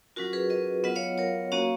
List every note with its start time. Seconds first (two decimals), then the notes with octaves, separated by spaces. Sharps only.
0.16 F#3 C#4 F4 F#4 A#4
0.33 G#4 B4
0.50 B4 D#5
0.84 F#3 B3 F4 D#5 F#5
0.96 C#5 F5
1.18 A#4 C#5
1.52 A#3 C#4 F#4 C#5 F5